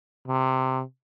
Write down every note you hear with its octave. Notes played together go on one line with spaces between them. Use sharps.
C3